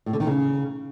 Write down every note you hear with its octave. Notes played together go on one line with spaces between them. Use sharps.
A2
D3
D#3
C#3